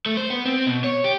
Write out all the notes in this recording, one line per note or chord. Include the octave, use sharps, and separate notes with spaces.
A3
C5
B3
C4
B2
C#5
G4